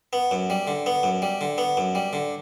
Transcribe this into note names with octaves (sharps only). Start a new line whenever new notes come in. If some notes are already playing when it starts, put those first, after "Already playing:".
B3
F#2
G3
D3
B3
F#2
G3
D3
B3
F#2
G3
D3